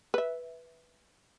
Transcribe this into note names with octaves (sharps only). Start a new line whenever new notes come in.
B4 E5